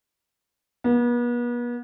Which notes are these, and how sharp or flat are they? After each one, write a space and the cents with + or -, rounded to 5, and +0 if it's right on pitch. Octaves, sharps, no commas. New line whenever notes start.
B3 -40